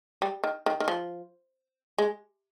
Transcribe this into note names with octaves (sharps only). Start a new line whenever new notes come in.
G3
D#3
D#3
D#3
F3
G#3